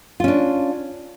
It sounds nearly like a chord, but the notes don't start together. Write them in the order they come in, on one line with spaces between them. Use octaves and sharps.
F4 C#4 D4